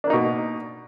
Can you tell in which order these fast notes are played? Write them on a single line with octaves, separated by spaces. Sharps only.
D4 A#3 D#4 B2